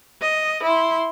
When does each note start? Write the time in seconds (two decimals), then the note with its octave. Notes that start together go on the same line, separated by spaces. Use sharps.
0.22 D#5
0.63 E4 C6